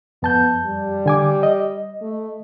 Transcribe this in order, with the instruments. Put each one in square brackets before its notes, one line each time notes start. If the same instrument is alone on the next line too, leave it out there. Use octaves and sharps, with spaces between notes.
[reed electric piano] F2 A5 G6 [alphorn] B3
[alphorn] G3
[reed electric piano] D3 G#5 D6
D#5
[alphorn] A3